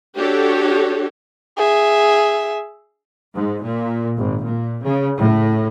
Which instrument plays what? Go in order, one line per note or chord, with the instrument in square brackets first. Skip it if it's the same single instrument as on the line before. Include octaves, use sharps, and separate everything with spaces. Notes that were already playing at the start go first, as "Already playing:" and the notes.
[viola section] D4 F#4 G4 A4 C#5
[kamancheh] G#4 E5
[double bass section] G#2
A#2
G#1
A#2
C#3
A2